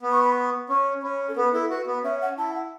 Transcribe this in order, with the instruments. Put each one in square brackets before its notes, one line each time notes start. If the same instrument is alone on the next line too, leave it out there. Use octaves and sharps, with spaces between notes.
[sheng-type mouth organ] B3
[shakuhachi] C#6
B5
C#6
[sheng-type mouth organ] C#4 [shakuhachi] C#6
[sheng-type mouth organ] C#4 [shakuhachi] B5
[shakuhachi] A4
[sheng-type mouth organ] B3 [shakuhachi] B4
[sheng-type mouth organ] E4 [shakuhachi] A4
[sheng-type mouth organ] F#4 [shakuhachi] B4
[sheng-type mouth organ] B3
[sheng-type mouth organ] C#4 [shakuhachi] E5
[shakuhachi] F#5
[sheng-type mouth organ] E4 [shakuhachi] A5
[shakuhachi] F#5